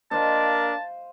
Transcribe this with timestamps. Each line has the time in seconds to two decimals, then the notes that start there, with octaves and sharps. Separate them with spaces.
0.11 A#3 D4 A#4 C5 D#5 F5 A5